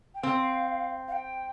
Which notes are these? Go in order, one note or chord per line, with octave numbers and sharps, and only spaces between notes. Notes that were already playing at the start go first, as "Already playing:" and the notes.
G5
C4 F5
F5
G5